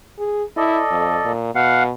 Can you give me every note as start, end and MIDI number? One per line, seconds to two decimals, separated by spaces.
0.19 0.44 68
0.57 0.81 64
0.57 1.32 69
0.57 1.32 74
0.57 1.32 75
0.90 1.19 41
1.25 1.52 46
1.55 1.93 47
1.55 1.83 77
1.55 1.83 78